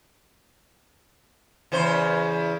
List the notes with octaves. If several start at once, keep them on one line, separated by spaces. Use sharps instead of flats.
E2 C#3 C5